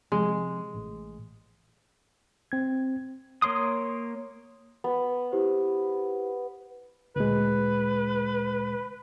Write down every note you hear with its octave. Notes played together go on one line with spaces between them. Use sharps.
C3 F3 G#3 C4
A1
C4 G#6
A#3 C#5 C6 D#6
B3
E4 G4 C5
D2 A#2 G#3 B4